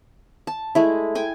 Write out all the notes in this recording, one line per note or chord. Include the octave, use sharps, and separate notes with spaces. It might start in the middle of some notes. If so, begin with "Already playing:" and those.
A5
G#3 A3 E4
G5 G#5